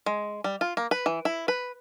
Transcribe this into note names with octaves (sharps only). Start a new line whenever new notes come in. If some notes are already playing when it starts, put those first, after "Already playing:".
G#3
G3
F4
A#3
B4
E3
E4
B4